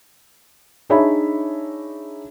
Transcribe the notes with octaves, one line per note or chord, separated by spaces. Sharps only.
D4 D#4 G#4 C#5 E5 B5